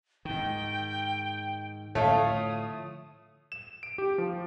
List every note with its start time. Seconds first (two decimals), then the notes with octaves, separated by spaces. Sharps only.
0.25 G#2 D#3 G5
1.95 A2 D3 F3 A3 C#5 F5 D#6
3.52 E7
3.83 D7
3.98 G4
4.18 F3